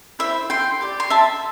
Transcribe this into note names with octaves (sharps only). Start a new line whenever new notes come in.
E4 C5 E5
G5 C6
G4 D5
C6
E5 A5